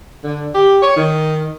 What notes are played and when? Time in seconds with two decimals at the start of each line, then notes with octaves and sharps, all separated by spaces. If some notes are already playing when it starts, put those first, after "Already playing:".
0.24 D3
0.53 G4
0.81 C#5
0.95 D#3